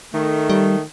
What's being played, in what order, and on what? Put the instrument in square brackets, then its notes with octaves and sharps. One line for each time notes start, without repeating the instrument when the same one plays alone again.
[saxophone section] D#3 A3
[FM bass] G3